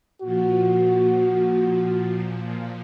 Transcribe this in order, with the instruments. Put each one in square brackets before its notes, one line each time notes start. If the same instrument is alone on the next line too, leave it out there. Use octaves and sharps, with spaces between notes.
[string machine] A#2 F3 [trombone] F#4